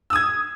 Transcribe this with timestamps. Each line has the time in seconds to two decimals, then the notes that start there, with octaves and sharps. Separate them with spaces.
0.10 E6
0.13 D#6
0.16 G#6